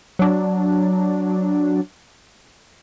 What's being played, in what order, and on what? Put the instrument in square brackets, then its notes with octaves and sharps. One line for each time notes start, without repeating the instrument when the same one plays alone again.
[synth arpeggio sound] F#3 D4